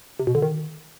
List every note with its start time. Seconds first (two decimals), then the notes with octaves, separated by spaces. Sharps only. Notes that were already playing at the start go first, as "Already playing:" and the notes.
0.19 C3
0.27 B2
0.35 D3
0.42 D#3